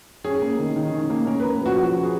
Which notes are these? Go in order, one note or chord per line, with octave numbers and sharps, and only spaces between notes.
C#4 G#4
A#3
D#3
D#3
C#4
A#3
C#4 A#4
A#3 B4
F3 F#4
F3 F#4
C#4
G#4